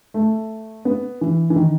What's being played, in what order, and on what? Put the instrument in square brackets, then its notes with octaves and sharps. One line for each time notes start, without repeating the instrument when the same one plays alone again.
[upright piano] A3
B3
E3
E3
D#3